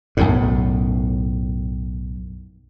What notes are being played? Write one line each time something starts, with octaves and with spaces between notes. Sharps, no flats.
B1 F#2 A2